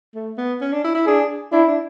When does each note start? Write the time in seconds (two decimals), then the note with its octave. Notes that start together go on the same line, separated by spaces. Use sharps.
0.15 A3
0.38 B3
0.61 C#4
0.73 D4
0.84 E4
0.94 E4
1.06 D4 G#4
1.52 D4 E4
1.68 D4